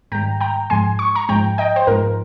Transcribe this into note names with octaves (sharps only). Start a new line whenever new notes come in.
G#2 D#3 G3 G5 A#5
G5 A#5
G#2 F3 G#3 G#5 C6
C#6
A#5 C#6
G#2 F3 G#3 G5 A#5
D#5 G5
C5
G#2 F3 G#3 A#4